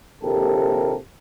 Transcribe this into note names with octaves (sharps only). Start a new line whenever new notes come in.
A#1 D#2 C3 G4 A4 A#4